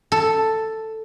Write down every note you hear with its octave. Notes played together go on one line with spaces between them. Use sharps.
A4